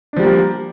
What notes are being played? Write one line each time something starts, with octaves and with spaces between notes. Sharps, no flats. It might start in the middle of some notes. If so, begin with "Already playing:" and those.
F3 G3 A#3 D4 G4